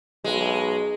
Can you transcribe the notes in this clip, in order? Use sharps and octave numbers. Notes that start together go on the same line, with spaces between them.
B1 G#3